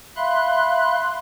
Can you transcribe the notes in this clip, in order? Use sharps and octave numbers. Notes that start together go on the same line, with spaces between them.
E5 F5 B5 C6 F#6